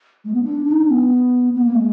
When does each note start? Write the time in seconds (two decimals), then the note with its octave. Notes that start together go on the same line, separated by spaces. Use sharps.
0.25 G#3
0.34 B3
0.43 D4
0.65 D4
0.71 D#4
0.81 D4
0.90 B3
1.56 B3
1.65 A#3
1.75 G#3